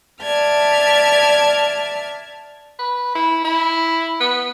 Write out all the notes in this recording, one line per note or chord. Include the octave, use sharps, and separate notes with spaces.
D5 E5 A5 F6 G#6
B4
E4
E4
B3